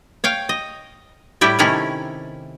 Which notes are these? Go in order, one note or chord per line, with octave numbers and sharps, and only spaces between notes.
C#5 F5 G5
D#5
A2 G3 E4 G4 E5
C3 D#3 A3 C#4 E4